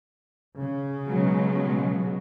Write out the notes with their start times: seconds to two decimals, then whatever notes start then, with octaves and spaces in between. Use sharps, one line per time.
0.61 C#3
1.08 B2 F#3 G#3